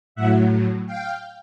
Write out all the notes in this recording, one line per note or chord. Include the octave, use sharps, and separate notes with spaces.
A2 F#3 E5 F#5
F5 G5